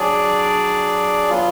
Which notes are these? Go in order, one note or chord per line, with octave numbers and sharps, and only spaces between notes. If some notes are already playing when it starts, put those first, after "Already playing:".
Already playing: F#3 D4 G#4 D5
F#3 B3 F4